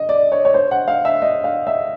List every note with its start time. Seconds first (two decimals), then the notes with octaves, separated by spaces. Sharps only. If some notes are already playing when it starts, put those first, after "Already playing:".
Already playing: D#5
0.09 D5
0.32 C#5
0.45 C#5
0.54 C5
0.71 F#5
0.88 F5
1.05 E5
1.22 D#5
1.44 F5
1.67 E5